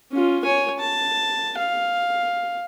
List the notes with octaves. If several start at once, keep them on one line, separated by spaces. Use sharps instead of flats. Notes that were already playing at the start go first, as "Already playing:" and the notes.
C#4 F4
C#5 G#5
A5
F5